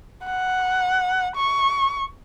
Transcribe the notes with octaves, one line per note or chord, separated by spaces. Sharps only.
F#5
C#6